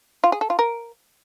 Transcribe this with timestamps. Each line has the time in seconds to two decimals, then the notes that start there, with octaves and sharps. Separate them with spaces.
0.24 F4
0.32 G#4
0.41 A4
0.50 F4
0.59 A#4